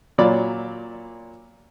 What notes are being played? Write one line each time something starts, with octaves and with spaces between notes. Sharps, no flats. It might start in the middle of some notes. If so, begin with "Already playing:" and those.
A#2 F#3 D5 B5